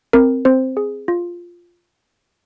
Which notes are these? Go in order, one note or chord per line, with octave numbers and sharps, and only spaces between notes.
C4 A#4
C4 C5
G#4
F4